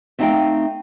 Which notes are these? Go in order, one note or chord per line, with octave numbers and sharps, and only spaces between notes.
A3 C4 D#4 D#5 F5 G5